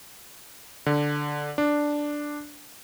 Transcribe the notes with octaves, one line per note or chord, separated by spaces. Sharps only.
D3
D4